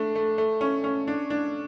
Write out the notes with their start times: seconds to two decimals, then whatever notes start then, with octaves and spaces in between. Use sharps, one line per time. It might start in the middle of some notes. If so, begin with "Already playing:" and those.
Already playing: A3 D4
0.15 A3
0.38 A3
0.61 C#4
0.84 C#4
1.07 D4
1.30 D4